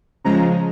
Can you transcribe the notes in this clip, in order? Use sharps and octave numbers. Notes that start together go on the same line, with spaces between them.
C#3 F3 G#3 A#5